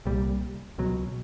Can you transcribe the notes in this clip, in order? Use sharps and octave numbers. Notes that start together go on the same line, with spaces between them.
C2 A#2 G3
C#2 B2 F#3